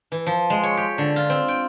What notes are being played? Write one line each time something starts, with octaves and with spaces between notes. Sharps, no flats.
E3
F3
G#3
C#5
G4
D3
F4
C4
G5